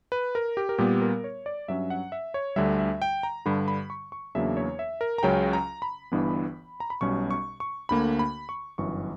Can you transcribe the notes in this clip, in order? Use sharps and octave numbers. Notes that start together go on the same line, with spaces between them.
B4
A#4
G4
A#4
A#2 G3 B3 G4
A#4
C#5
D5
G2 F#3 C#4 E5
F#5
E5
C#5
D2 D3 G3 E5
E5
G5
A#5
G2 D3 G3 B5
B5
C#6
C#6
E2 C#3 F#3 A#3 D4 E5
C#5
E5
A#4
A#5
C#2 C#3 F#3 C#4 G5
A#5
B5
G1 G2 E3 B3 D4
A#5
B5
B1 B2 G3 C#4 C#6
C#6
C#6
D2 D3 A#3 B5
B5
C#6
G1 F#2 E3 C#6